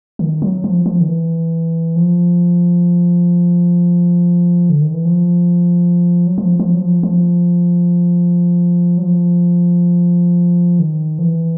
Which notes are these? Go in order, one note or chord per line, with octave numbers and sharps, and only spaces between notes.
D#3
F#3
F3
F3
D#3
E3
F3
D3
D#3
E3
F3
F#3
F3
F3
F#3
F3
F3
F#3
F3
D#3
F3
E3